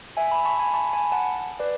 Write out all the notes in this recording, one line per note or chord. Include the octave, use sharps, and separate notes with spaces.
E5 G#5
G#5 B5
A5 C#6
G#5 B5
A5 C#6
G#5 B5
F#5 A5
B4 D5